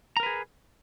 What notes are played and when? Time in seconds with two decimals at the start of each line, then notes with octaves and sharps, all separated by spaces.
0.17 A#5
0.20 A#4
0.23 B4
0.26 G#4